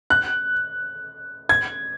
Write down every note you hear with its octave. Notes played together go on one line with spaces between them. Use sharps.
F#6
G#6